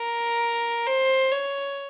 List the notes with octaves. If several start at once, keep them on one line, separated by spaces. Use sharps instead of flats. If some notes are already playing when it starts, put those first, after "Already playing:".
Already playing: A#4
C5
C#5